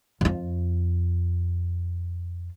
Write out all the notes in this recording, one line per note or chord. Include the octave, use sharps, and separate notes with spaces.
F2 F4